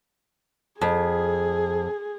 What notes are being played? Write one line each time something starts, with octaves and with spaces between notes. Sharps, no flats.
F2 G#4